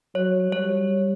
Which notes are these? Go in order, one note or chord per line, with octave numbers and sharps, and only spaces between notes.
F#3 C#5
G3 C#5